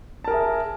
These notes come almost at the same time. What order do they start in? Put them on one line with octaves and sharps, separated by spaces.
A5 A#4 G#4 E5